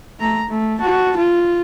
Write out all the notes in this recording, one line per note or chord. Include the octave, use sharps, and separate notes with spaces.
A3 A#5
A3
F#4 A5
F4